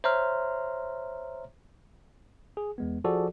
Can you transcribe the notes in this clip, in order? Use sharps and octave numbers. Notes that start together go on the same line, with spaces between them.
C5 C#5 E5 A#5 C6 F6
G#4
E2 G#3 B3
F3 F#4 G#4 A4 D5